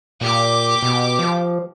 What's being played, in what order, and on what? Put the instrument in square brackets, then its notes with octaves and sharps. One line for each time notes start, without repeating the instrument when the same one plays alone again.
[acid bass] A#2 [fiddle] G4 D6
[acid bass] B2
F3